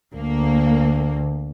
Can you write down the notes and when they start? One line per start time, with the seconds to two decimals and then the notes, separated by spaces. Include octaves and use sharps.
0.15 D2 A#3